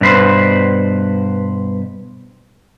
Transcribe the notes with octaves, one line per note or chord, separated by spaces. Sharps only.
G2 B2 B4 C5